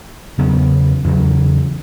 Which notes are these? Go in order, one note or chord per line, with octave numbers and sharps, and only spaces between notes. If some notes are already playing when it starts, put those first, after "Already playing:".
E2 C#3 F#3 B3
E2 C#3 F#3